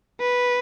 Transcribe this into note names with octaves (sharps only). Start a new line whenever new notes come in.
B4